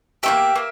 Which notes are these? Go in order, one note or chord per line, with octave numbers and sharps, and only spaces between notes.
A#3 C#4 G4 E5
A#3